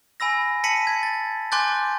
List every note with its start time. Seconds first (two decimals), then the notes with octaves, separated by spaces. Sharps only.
0.20 G#5 B5 E6 A#6
0.64 A5 B6 C#7 D#7 F#7
0.87 G#6
1.03 A6
1.52 G#5 C6 D6 F#6 G6 A6